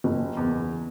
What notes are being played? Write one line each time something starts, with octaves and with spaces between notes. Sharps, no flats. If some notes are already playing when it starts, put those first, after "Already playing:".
F#1
E2